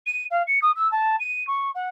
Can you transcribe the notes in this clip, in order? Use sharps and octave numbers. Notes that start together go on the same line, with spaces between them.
D#7
F5
C#7
D#6
E6
A5
D#7
C#6
F#5